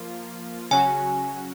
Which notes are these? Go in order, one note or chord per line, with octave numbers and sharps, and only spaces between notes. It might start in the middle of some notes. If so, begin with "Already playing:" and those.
Already playing: F3 A#3 F4
C#3 F#3 C#4 F#4 G#5